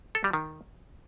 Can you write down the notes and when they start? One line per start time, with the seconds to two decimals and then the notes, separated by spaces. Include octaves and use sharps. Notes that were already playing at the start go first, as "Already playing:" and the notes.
0.15 A4
0.24 G3
0.33 D#3